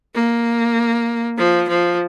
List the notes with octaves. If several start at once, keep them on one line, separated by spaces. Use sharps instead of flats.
A#3
F3
F3